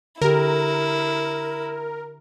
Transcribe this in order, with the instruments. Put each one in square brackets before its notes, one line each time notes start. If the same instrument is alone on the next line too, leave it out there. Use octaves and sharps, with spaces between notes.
[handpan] D3 G4 [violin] E4 [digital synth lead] A#4